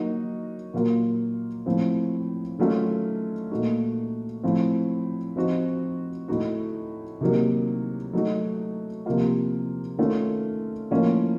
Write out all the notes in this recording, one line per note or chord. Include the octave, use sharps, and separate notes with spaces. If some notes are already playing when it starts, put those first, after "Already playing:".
Already playing: F#3 A#3 D#4 F#4
A#2 F#3 A#3 F4
A2 F3 C4
D#3 F#3 A3 C#4 F4
A#2 A3 D#4 F#4
A2 F3 C4
F3 C4 D#4 F#4
A2 A3 D#4 F#4
C3 D#3 F#3 A#3
F#3 A3 D#4 F#4
C3 F3 A#3 F4
D#3 A3 C#4 F4
A2 F3 A#3 C#4 F4